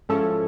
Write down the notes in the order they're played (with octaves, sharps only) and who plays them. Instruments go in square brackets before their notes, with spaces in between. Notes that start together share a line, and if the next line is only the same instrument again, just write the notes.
[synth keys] G#2 F3 G#3 C#4 E4 [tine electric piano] A4